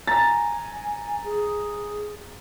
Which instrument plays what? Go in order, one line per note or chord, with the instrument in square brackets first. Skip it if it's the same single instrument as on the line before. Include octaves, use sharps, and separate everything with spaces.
[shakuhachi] G#5 [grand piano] A#5 A6
[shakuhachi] G#4